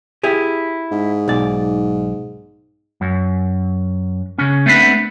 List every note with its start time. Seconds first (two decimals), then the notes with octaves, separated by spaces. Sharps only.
0.23 E4 G4 G#4
0.91 G#2
1.28 B1 D5
3.01 F#2
4.38 C#3 C#4
4.66 A3 B3 C4 D4 B4